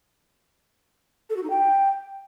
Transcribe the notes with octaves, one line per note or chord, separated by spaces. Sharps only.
A4
F#4
D#4
G5